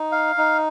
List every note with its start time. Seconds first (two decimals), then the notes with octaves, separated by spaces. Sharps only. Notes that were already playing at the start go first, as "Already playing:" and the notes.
Already playing: D#4
0.12 F5
0.38 D#4